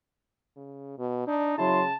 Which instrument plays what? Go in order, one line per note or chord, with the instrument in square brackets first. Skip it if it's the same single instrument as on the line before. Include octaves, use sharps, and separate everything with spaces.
[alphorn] C#3
B2
[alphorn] D4 [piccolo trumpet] D#4
[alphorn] C#3 [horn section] F#3 E4 C6 [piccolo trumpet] A5